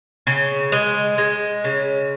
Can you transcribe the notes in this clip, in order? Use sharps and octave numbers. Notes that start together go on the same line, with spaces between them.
C#3
G#3
G#3
C#3